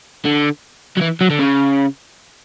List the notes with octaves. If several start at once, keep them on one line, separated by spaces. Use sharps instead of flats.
D3
F#3
E3
F#3
D3
C#3